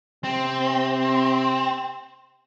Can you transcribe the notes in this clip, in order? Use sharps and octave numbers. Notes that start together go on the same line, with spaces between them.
C3 C4